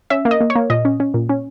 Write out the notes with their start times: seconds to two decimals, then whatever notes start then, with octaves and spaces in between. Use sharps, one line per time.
0.10 C#4 E5
0.25 A#3
0.31 D#5
0.40 A#3
0.50 C#5
0.55 A#3
0.70 A#2 D#5
0.85 C#4
1.00 C#4
1.14 A#2
1.29 C#4